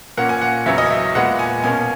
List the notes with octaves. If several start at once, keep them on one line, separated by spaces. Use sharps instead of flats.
A#2 A#3 C#4 F#5
G#5
F#5
E2 C#3 F#3 C#4 E5
D#5
E5
A#2 G#3 B3 F#5
G#5
B2 A#3 C#4 G#5